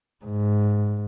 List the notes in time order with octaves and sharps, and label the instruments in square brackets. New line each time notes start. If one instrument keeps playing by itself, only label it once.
[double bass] G#2